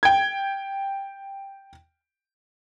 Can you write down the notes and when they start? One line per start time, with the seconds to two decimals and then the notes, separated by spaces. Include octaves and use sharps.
0.03 G5 G#6